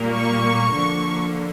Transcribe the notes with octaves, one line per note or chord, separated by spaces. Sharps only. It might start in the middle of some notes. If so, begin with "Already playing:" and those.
Already playing: A#2 G3 A#3
C#6
D3 F3 A#3